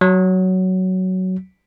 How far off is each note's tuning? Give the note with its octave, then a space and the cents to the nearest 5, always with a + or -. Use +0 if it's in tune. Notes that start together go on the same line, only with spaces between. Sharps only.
F#3 +10